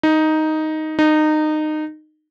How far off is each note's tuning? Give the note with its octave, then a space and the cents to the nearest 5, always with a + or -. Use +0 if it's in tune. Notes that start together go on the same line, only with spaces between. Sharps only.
D#4 +5
D#4 -20